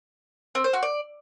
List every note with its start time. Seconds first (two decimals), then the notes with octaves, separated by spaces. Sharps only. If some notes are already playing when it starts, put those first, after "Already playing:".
0.55 C4
0.64 C5
0.73 F#4
0.83 D5